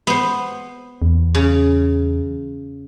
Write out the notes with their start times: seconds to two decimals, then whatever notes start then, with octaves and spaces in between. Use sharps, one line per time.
0.07 B3 C5
1.02 E2
1.35 C#3